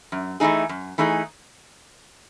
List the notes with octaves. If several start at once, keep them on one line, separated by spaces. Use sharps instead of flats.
F#2
E3 A3 D#4 G#4
F#2
E3 A3 D#4 G#4